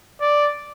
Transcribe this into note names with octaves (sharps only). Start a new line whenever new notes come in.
D5